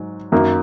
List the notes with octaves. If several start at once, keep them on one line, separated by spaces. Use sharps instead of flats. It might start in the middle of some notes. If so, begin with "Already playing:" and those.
Already playing: G#2 F#3
F#2 D#3 F#3 A#3